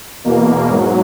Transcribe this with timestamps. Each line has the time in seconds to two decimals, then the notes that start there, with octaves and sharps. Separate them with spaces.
0.24 E2 B2 A#3
0.68 G#2 F#3